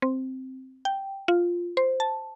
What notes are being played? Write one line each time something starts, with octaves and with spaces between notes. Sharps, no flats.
C4
G5
F4
C5
A5